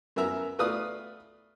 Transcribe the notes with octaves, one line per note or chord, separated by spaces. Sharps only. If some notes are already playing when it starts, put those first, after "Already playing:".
F#2 B3 A#4 E5 A#5
A3 B3 B4 D5 F5 D#6